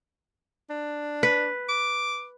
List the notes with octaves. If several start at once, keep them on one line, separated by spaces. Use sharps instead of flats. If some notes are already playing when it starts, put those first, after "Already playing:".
D4
B4
D6